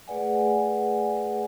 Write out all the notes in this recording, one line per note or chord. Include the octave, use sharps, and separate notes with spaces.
A3 G#4 B4 D5 F#5 G#5